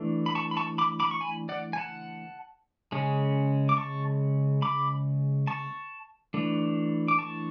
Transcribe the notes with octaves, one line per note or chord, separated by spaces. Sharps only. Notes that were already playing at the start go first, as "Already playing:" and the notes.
Already playing: E3 A3 D4
B5
A5 C#6
B5
A5 C#6
B5 D6
B5 D6
C#6
G#5 B5
D5 F#5
G#5
F#5 A5
C#3 G#3 C#4
D6
A5 C#6
B5 D6
A5 C#6
E3 A3 D4
D6
A5 C#6